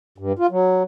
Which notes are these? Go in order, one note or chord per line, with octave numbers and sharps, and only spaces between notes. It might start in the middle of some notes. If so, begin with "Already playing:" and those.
G2
F4
F#3